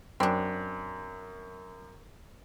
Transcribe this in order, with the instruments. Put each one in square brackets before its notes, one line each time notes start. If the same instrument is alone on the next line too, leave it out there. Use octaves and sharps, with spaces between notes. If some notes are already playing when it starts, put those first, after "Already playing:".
[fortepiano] F#2 [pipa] C4 D4